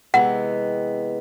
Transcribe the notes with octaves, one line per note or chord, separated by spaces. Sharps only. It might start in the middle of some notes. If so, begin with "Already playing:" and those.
C3 E3 G#3 B3 F#5